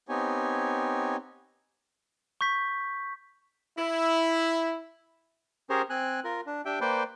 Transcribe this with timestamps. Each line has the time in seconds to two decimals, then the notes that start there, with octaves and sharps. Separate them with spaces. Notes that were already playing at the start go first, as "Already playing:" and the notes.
0.09 B3 C4 D#4 G4 C#5 G#5
2.41 C#6 G6 B6
3.77 E4
5.70 C#4 G4 G#4 A#4 C5 C#5
5.90 C4 G#5 F#6
6.24 F4 A#4
6.47 D4
6.65 D4 G4 E5 G5
6.81 A#3 B4 C5 D5 G5